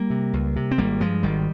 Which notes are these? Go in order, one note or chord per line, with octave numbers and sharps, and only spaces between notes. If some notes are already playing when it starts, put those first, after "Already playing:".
Already playing: G3 A#3
C3
C#2
C3
C4
G#1 G3 A#3
G2 F3 G#3
G#1 D#3 G3